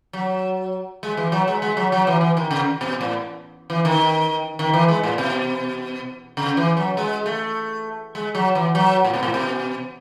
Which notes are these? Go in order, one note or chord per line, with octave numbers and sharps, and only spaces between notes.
F#3
G#3
E3
F#3
G#3
G#3
F#3
F#3
E3
E3
D#3
C#3
B2
A2
E3
D#3
D#3
E3
G#3
A2
B2
C#3
E3
F#3
G#3
A3
G#3
F#3
E3
F#3
A2
B2
A2
B2